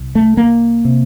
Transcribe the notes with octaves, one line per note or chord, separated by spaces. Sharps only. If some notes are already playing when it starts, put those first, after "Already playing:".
Already playing: C2
A3
A#3
C3